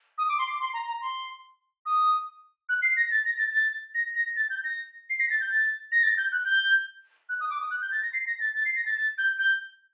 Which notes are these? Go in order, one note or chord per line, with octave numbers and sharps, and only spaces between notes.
D#6
D6
C6
D6
C6
A#5
A#5
C6
D#6
F#6
C7
A#6
A6
A#6
A6
A6
A#6
A#6
A6
G6
A#6
C7
A#6
A6
G6
A6
A#6
A6
G6
F#6
G6
F#6
D#6
D6
D#6
F#6
G6
A6
A#6
C7
A#6
A6
A6
C7
A#6
A6
A6
G6
G6